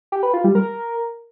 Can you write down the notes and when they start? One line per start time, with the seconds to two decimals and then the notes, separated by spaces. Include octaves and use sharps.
0.12 G4
0.23 B4
0.34 F4
0.44 G3
0.55 A#4